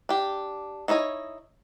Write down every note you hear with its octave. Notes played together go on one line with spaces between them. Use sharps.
D4 G4
D#4 E4 C#5 D#5